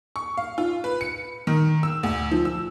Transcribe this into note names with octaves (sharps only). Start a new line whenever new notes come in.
C#6
F5
F4
B4
C#7
D#3
E6
D2
F3
E6